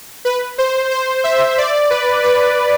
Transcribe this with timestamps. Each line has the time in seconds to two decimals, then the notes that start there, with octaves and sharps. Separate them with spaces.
0.25 B4
0.58 C5
0.91 C5
1.24 E5
1.58 D5
1.90 B4
2.23 B4